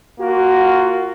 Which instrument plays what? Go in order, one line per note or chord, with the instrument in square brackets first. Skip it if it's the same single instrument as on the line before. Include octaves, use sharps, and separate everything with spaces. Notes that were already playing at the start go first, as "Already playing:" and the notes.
[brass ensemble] A#3 F4 F#4